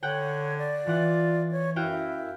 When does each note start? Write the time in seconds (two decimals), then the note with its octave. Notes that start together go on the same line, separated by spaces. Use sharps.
0.03 D3 C#5 F#5 G5
0.58 D5
0.87 E3 F4 F#5
1.51 C#5
1.76 F#2 E4 F#4 F5 G5